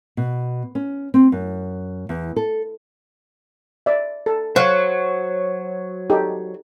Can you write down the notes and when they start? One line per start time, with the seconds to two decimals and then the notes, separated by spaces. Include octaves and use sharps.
0.17 B2
0.75 C#4
1.14 C4
1.32 F#2
2.09 E2
2.36 A4
3.86 D5 E5
4.26 A4
4.56 F#3 C5 C#5 F5
6.10 D#4 G4 A4